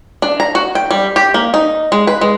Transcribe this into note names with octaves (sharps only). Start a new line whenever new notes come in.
D4
A#5
F#4
G5
G3
G4
A#3
D#4
G#3
B4
G#3